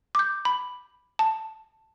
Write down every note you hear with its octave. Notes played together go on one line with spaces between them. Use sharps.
D6 G6
B5
A5